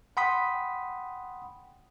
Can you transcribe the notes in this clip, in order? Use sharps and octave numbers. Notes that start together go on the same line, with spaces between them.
F#5 G5 B5 C6 D#6 B6